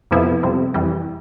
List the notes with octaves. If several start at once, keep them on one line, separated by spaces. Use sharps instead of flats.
F2 C3 F3 B3 E4
F2 C3 G3 C4
F2 E3 G3